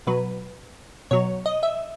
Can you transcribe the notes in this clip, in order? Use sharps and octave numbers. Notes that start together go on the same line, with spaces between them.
B2 F#3 B4
B2 F#3 C#5
D#5
E5